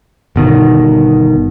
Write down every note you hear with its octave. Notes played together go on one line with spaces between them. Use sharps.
G1 B2 D#3